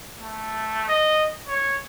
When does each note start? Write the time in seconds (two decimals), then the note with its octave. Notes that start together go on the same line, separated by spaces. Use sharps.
0.19 A3
0.88 D#5
1.48 C#5